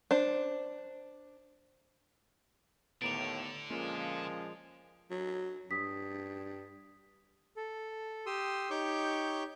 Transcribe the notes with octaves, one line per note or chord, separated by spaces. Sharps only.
D4 C5
D#2 A2 D3 B3 A#5 D6 D7 F7
A#2 F3 G#3 A#3 C#4 F4
F#3
G2 D#6 B6
A4
G4 C6 D#6 E6
D#4 G4 C#5 C#6 D6 G6